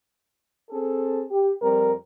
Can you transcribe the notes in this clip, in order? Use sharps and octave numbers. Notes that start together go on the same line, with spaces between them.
C4 G#4 A4
G4
F2 G3 C4 A#4